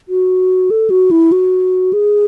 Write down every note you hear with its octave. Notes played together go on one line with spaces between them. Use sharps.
F#4
A4
F#4
E4
F#4
G#4